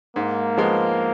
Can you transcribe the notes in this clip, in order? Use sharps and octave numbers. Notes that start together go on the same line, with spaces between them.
G#2 A#3
F3 G#3 B3